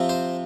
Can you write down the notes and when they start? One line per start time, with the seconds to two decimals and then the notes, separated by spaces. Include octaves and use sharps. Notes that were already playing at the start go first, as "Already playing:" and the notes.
Already playing: C3 F3 C4
0.09 C5